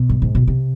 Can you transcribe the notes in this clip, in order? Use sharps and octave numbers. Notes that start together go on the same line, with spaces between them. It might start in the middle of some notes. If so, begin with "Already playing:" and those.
Already playing: B2
G2
G#2
B2
C3